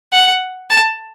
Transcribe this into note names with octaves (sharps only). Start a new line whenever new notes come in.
F#5
A5